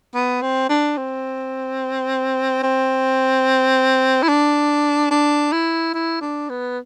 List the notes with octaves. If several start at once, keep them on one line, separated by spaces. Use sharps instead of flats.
B3
C4
D4
C4
C4
E4
D4
D4
E4
E4
D4
B3